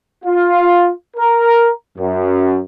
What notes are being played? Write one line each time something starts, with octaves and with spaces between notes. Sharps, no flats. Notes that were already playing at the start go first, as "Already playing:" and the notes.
F4
A#4
F#2